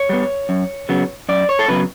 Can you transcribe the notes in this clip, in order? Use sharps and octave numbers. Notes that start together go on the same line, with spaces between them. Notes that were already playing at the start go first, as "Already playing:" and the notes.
Already playing: C#5
G3 B3
F#2
C#3 F#3 B3
F#2 D5
C#5
A4
C#3 F#3 B3 B4